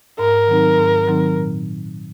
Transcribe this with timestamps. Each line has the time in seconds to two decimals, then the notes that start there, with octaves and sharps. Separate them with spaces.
0.19 G#2 A#4
0.48 D#3 F#3 C4 D#4
0.78 G#2
1.07 D#3 F#3 C4 D#4
1.36 A#2